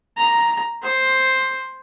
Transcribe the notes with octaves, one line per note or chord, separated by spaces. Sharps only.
A#5
C5